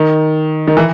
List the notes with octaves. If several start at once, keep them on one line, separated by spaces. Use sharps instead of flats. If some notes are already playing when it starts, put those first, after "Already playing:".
Already playing: D#3
D#3
E3